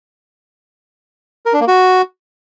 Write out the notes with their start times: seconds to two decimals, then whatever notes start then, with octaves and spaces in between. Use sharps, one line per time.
1.46 A#4
1.53 D4
1.60 A#3
1.68 F#4